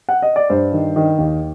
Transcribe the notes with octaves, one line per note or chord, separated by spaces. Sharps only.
F#5
D#5
D5
G2 C5
D#3
D#3
D#2